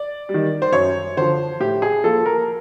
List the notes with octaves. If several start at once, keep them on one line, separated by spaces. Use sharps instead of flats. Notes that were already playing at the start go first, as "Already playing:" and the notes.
Already playing: D5
G3
D#3
C5
F#2 C#5
D3 F3 C5
A2 G4
G#4
F3 A#3 A4
A#4